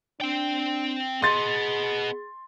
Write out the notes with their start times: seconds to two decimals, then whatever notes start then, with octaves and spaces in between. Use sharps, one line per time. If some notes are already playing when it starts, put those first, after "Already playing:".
0.21 C4 D4 G5
1.22 B3 G#4 D#5 C6 A6